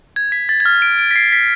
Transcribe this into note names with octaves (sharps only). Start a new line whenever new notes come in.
G#6
B6
A6
G#6
F6
D7
D7
B6
C7
B6